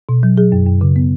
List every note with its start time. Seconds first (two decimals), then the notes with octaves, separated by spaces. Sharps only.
0.09 B2
0.23 F#3
0.37 F#3 G#4
0.52 F#2
0.67 F#2
0.81 C#3
0.96 B3